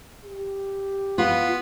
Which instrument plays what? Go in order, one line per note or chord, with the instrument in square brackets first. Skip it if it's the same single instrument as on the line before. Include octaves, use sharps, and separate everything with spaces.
[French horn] G4
[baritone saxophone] B3 [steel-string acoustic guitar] F4